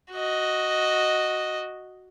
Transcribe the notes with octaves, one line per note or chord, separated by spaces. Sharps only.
F#4 D#5